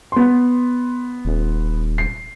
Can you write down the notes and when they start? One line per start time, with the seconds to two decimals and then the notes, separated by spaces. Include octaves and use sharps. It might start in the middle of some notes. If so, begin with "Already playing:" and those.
0.12 B3 C6
1.25 D#1
1.98 C7